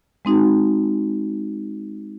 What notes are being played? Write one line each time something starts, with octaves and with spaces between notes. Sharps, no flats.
G#3 C4 D#4 F#4